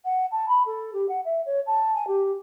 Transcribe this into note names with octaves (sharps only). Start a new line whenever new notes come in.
F#5
A5
B5
A4
G4
F#5
E5
C#5
A5
G#5
G4